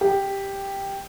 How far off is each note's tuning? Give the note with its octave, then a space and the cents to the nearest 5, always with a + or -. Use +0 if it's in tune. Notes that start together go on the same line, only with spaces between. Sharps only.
G4 +5